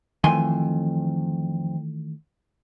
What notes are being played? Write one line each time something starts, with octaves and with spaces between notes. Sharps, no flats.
F2 D#3 E3 A3 G#5 C6